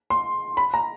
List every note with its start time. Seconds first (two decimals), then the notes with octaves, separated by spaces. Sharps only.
0.10 C6
0.57 B5
0.74 A#5